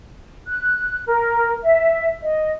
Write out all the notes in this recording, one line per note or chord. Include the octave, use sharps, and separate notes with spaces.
F#6
A#4
E5
D#5